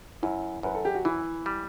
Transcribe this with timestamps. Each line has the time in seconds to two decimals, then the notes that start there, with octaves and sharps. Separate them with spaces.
0.23 F#2 E4
0.63 F#2 B4
0.75 A4
0.85 G4
0.95 F#4
1.05 E3 E4
1.46 G3